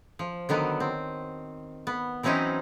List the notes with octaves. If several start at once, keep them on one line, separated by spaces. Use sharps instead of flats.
F3
D3 D#3 F#3 B3
C4
B3
E3 F#3 C4 C#4 D#4 E4